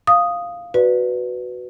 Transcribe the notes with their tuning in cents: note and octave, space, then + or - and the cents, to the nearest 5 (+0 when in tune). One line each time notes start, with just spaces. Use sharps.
F5 +0 D#6 +0
F#4 +0 B4 +0 D5 +0